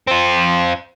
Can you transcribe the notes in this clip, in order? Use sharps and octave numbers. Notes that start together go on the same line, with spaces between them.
C4 F4